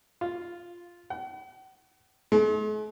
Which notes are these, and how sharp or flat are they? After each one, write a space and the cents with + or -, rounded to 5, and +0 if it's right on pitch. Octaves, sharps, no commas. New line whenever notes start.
F4 +0
F#5 +45
G#3 +45